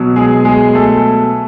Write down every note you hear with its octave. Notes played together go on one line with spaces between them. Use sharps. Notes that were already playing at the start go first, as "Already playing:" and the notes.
Already playing: B2 F#3
G#3 G#4
G#3 G#4
A3 A4